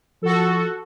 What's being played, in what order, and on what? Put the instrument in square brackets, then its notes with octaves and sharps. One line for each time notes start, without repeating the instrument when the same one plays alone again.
[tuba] F3 [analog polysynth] F#4 A4